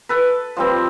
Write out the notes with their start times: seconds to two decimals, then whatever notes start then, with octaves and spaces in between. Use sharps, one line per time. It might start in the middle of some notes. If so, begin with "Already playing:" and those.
0.09 A4 B4
0.57 F3 G3 C4